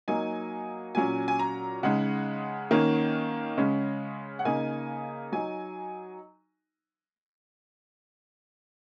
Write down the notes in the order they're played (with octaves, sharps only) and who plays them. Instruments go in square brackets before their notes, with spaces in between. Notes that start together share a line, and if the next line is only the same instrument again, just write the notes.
[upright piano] F#3 A#3 D#4 G#5
A#2 F#3 C#4 G#5
G#5
A#5
C#3 G#3 D#4 F#5
D#3 A#3 C#4
C#3 G#3 C#4
F#5
C#3 A#3 D#4 G#5
F#3 D#4 G#5